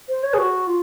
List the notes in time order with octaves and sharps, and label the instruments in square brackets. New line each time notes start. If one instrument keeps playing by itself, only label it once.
[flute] C5
C#5
G#4
F#4
F4